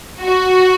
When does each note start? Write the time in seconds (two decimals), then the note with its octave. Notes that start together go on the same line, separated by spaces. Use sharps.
0.22 F#4